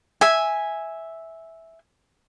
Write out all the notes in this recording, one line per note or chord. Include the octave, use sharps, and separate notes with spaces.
E5 G#5